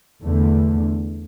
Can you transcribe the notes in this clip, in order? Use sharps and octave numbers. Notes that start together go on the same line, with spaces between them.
E2 D3 A3